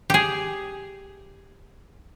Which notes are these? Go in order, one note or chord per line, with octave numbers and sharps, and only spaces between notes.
G4 G#4